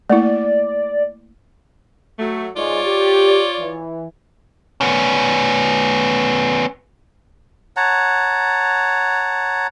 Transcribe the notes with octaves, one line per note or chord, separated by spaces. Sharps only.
A3 A#3 E4 D5
F#3 A3
G#2 G#3 F4 C#5 D5
G4
E3
B3 C#4
C#5 F#5 A5 A#5